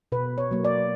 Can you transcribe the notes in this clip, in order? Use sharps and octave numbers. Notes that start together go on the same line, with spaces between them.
B2 B4
C#5
F#3 A#3
D5